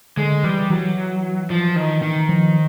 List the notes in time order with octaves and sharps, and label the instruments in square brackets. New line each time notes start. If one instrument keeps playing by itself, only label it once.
[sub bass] D3 [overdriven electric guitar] G#3
[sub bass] E3 [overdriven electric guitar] G3
[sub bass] E3 [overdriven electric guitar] F#3
[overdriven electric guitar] F3
D#3
D#3
[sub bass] F3